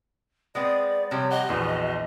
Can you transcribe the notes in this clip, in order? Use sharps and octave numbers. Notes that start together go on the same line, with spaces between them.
G#3 B3 C4 D5
C3 F3 G3 C#5
G4 D#5 F#5
A#1 E2 F3 F#4